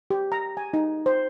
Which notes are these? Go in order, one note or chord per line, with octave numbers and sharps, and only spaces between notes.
G4
A#5
G#5
D#4
C5